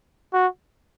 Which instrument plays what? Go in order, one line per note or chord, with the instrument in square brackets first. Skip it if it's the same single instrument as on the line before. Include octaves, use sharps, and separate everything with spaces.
[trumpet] F#4